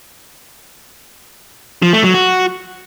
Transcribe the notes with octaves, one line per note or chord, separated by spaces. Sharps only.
F3
A3
F#3
F#4